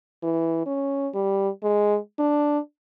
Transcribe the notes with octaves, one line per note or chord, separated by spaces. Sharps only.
E3
C#4
G3
G#3
D4